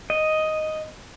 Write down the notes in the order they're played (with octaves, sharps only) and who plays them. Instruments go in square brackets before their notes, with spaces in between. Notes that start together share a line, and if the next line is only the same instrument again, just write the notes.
[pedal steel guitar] D#5